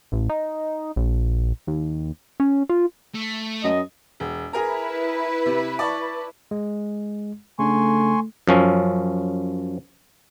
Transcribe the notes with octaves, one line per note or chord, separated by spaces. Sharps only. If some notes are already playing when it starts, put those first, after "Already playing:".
A1
D#4
A#1
D#2
C#4
F4
A3
F#2 D#5
E1
E4 G#4 A#4 B4 A#5
C3
D5 A5 C#6
G#3
C#3 A3 D4 G#5 C6 C#6
F#2 F3 C#4